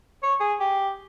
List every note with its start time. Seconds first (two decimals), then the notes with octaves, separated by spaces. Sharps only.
0.23 C#5
0.40 G#4
0.60 G4